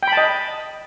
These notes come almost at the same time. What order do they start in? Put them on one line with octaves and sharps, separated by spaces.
G5 B5 A5 D#5